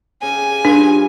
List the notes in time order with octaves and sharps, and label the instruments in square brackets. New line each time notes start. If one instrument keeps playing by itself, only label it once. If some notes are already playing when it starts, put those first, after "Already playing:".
[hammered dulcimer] C#3 G4 [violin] G#5
[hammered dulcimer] G2 F4 [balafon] D4